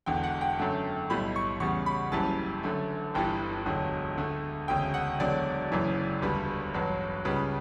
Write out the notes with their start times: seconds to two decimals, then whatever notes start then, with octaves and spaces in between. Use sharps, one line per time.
0.06 E1 E2 D3 G5
0.23 F#5
0.41 G5
0.59 F#2 D3 A3
1.10 B1 A2 G3 B5
1.36 C#6
1.60 E2 C#3 G3 C#6
1.86 B5
2.12 F#1 F#2 E3 G3 A5
2.63 F#2 D3 A3
3.14 G1 G2 E3 G3 G5
3.65 E1 D2 D3 F#3
4.17 D2 D3 A3
4.68 E1 D2 C#3 G5
4.94 F#5
5.20 E1 E2 D3 F#3 D5
5.72 F#1 F#2 C#3 E3
6.22 E1 D2 D3 G3 B4
6.74 A1 G2 F#3 B4
7.25 C#2 C#3 G3 B4